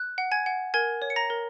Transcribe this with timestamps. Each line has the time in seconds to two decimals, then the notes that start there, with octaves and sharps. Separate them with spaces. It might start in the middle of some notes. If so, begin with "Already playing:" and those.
Already playing: F#6
0.18 F#5
0.32 G#5 G#6
0.46 F#5
0.74 A#4 G#5 G#6
1.02 C#5
1.10 C#7
1.16 A#5 A#6
1.30 A#4